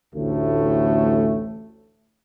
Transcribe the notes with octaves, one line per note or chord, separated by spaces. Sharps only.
A1 D2 A2 A3